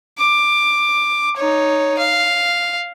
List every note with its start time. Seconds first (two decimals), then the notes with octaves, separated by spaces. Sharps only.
0.18 D6
1.36 D#4 C#5
1.98 F5